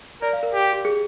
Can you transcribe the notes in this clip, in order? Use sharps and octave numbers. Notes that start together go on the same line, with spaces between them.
A#4 D5
F5
A#4
G4
G4
G#4